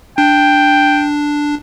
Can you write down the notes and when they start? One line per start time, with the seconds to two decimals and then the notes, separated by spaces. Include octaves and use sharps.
0.18 D4 G5